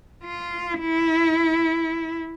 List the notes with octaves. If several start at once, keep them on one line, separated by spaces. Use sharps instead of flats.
F4
E4